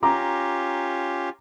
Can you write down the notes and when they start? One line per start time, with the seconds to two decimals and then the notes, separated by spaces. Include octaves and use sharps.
0.03 C#4 F4 G4 A#5 D6